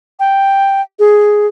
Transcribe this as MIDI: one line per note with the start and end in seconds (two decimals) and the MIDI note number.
0.20 0.82 79
0.99 1.47 68